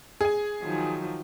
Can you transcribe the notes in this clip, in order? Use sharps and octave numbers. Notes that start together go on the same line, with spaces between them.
G#4 G#5
D#3 F3 F#3